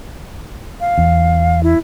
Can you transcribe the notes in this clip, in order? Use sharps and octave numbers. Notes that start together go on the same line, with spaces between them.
F5
E2
E4